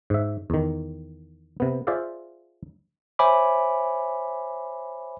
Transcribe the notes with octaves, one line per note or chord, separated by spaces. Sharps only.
G#2 E5
E2 D#3
C3 B3
F4 G#4 C5 D5 E5 F5
C5 C#5 E5 G#5 B5 D6